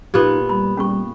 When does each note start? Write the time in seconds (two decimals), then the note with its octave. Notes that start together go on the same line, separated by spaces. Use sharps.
0.14 A#2 B3 D#4 G4
0.49 G3 B5
0.77 G3 C#4 G#4 C#6